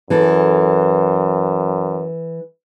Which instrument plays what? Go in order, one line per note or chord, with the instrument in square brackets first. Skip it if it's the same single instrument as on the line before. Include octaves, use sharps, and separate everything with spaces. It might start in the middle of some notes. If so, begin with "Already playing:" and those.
[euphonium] F#2 [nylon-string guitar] E3 A4